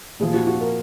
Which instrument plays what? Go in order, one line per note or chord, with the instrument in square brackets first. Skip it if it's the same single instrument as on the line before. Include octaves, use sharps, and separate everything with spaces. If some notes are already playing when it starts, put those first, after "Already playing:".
[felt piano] A#2 F3 G#4
F#4
F#4
A#4